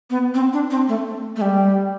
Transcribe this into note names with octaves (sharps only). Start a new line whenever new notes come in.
B3
C4
D4
C4
A3
A3
G3